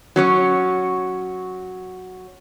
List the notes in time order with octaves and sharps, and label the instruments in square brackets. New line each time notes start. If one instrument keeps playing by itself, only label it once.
[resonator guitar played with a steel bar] F#3 C#4 C#5